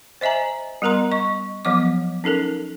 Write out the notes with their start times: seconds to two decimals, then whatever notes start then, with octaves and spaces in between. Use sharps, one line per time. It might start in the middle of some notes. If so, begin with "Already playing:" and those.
0.21 C5 D#5 E5 G#5 A#5
0.82 G3 B3 A#4 A#5 C6
1.12 D#5 C#6
1.65 F3 F#3 B3 D#5 D6
2.24 C#4 D#4 A4 A#4